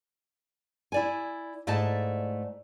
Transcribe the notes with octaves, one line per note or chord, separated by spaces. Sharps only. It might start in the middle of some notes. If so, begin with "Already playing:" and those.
E4 D5 G#5
G#2 A3 E4 D5 D#5 A5